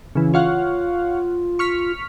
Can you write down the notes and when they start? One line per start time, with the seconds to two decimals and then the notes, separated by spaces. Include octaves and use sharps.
0.15 C#3 E3
0.34 F4 C#5 F5 F#5
1.59 C#6 F6 B6